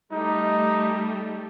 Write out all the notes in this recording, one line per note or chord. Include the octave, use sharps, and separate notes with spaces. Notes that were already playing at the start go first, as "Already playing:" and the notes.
G3 A3 D#4